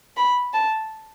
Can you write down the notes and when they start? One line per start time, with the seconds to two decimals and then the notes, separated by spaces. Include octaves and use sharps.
0.17 B5
0.53 A5